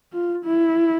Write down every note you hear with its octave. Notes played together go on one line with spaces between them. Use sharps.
F4
E4